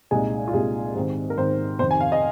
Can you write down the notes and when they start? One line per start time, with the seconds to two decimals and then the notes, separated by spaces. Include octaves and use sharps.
0.11 C2 A#2 G#3 D#4 G#5
0.48 F4
0.54 C2 A#2 G#3 D#4 G#4
0.95 G#2 D#3 C4
1.30 A#4
1.38 G#2 D#3 C4 C5
1.79 F1 F2 D#3 C5
1.91 G#5
2.01 F5
2.12 D#5